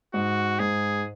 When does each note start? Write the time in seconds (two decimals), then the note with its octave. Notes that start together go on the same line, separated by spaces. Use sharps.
0.14 G#2 F#4
0.59 G#2 G#4